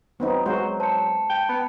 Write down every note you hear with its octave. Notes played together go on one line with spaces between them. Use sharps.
F#3 B3 C4 D#4
G#3 F#4 C5
C5 A5 C#7
G5
B3 B5